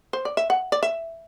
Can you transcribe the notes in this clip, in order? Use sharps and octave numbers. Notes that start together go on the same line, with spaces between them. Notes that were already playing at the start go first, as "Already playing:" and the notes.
C5
D5
E5
F#5
D5
E5